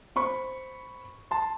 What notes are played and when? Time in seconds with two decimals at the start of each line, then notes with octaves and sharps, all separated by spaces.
0.16 C5 B5 C#6
1.31 A5 C6